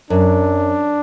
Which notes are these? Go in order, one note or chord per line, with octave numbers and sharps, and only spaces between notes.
F#2 D4